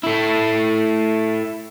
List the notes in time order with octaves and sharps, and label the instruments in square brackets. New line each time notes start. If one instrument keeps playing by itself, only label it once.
[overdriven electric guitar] A3 E4